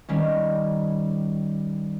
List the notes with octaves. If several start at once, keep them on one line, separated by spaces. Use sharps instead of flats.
D#3 G3 C#4